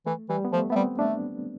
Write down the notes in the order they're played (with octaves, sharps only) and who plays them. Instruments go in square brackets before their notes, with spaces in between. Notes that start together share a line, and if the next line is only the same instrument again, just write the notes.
[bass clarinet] E3 [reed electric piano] A3
[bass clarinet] E3 [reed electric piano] G3
[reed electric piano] B3
[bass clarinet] F3 [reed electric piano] A3
[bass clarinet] A3 [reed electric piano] B3
[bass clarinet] G3 [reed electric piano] C4
[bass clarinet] A3 [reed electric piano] D4